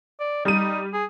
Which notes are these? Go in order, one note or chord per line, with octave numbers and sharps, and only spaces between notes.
D5
G3 D#4 D#7
G#4